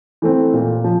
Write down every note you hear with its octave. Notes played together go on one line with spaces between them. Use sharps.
E3 A3 C4
A#2
F3